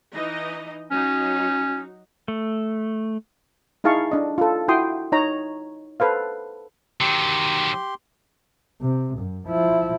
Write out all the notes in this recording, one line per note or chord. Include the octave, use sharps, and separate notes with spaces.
E3 D#4 D#5
F#3 C#4 D#4 F#4
A3
D#4 E4 G#4 F5 A5 C#6
D4 D#5
F4 A4
E4 F#4 G5 C6 D#6
D#4 C#5 A#5
A4 B4 C5 F5
D#3 F#3 G4 C6
C3
F#2
F3 E4